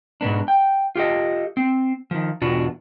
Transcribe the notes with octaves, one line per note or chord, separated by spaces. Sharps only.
G#2 B2 B3 D4
G5
F4 G4 A4 D#5
C4
D#3 F3
E2 B2 D4 F4 F#4